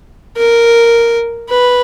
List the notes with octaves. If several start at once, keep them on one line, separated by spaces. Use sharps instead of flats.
A#4
B4